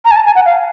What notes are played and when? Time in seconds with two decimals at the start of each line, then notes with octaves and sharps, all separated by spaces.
0.05 A#5
0.11 G#5
0.16 A5
0.26 G#5
0.35 F#5
0.45 F5